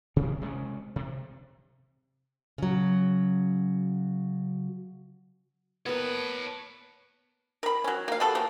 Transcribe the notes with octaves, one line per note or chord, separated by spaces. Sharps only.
A1 D2 C3
C3 G#3 A3 C#4
C3
C#3 F#3
B3 A#4 B4 C#5 A5
A#4 B5
F#3 C#4
A#3 F5
G3 B3 F#4 A4
F3 A#3